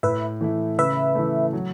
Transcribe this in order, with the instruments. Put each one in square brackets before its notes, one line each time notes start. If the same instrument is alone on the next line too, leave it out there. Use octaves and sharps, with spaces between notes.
[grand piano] A2 [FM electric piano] B4 E5
[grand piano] E3 A3 E4
[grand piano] C#3 [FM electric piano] B4 E5
[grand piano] E3 A3
F#3